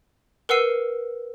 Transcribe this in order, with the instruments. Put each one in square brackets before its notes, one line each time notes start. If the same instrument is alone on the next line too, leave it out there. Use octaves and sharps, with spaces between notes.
[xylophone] A#4 B4 F#5 E6 C7 D#7